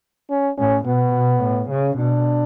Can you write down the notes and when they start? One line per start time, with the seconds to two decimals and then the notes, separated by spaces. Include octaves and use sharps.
0.30 C#4
0.58 A2 C#4
0.85 B2 B3
1.14 B2
1.42 A2
1.70 C#3
1.98 B2 D4